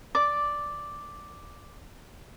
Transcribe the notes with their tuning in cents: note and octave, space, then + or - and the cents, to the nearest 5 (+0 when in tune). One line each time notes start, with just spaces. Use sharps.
D5 +0 D6 -5